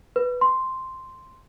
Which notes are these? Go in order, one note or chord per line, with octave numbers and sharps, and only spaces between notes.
B4
C6